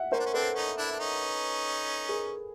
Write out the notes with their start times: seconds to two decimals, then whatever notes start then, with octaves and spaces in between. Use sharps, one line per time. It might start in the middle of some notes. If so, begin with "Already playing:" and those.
Already playing: E5 F#5
0.12 C#4 A#4 C5
0.20 D4
0.26 C#4
0.34 C4 D4 A4 B4
0.55 C#4 D#4
0.78 D4 E4
0.91 D4
0.99 C#4 D#4
2.09 G#4 A#4